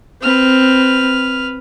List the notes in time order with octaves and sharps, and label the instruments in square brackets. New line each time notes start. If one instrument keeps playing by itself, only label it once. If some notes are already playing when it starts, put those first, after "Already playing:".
[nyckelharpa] C4 [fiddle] B4 F6